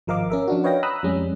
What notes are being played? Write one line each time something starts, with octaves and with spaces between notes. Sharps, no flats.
G#1 F3 A#4 D#5 F5 D6
C#4 A#4 E5
F3 D4 F#4
B4 C#5 D#5 F5 G5 A#6
A#5 B5 D#6 E6 F#6
F2 G3 G#3 C#4